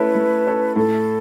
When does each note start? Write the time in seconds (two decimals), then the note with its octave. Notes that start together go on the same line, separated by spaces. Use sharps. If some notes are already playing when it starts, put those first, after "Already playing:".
Already playing: A3 C#4 E4 A4 B4 C#5
0.15 A3
0.47 C#4 E4 A4 C#5
0.76 A2 A4